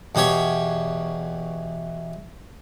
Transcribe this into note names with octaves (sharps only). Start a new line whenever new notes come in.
E2 B2 G4 C#5 C#6